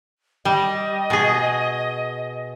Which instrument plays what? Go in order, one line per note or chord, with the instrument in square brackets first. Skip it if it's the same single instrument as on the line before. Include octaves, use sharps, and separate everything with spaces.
[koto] G3 [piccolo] D#5
[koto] B2 G#4